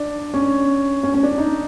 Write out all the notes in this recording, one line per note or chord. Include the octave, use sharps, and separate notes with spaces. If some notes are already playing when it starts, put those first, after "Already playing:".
Already playing: D4
C#4
C#4
C#4
D4
D#4